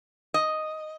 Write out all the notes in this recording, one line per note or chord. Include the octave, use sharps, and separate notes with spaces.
D#5